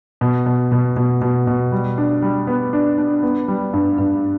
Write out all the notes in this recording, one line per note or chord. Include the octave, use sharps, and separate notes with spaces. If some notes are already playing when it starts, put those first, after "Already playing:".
B2
B2
B2
B2
B2
B2
G3
D4
G3
B3
D4
D4
B3
G3
G2
G2